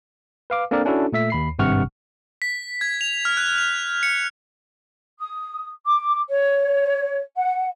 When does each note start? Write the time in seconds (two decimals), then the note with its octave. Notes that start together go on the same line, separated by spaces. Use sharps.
0.50 B4 F5 D6
0.71 A#3 C4 D4 A4 A#4 D5
0.85 C#4 D4 E4 F#4 A4
1.12 A#2 A3 E5 B6
1.30 D#2 B5 C7
1.59 G#1 G2 C3 F#5 C#6 F6
2.42 B6
2.81 G#6
3.01 F7
3.25 F6
3.37 F#6
3.58 F7
4.03 C#7
5.18 D#6
5.86 D6
6.30 C#5
7.35 F#5